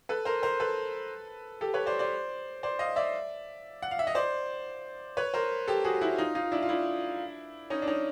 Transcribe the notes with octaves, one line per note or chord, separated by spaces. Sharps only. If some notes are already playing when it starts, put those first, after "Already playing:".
A4 B4
A#4 C5
A#4 C5
A4 B4
G4 A4
B4 C#5
C5 D5
C5 D5
C5 D5
D#5 F5
D5 E5
F#5
F5
E5
D#5
C5 D5
B4 C#5
A#4 C5
G4 A4
F#4 G#4
E4 F#4
D#4 F4
D#4 F4
D4 E4
F4
D4 E4
C#4 D#4
D4
C#4 D#4